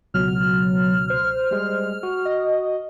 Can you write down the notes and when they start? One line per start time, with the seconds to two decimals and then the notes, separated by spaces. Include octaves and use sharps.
0.14 C#2 B2 F#3 F6
1.10 C5
1.51 G3 G#3
2.03 F#4
2.25 D#5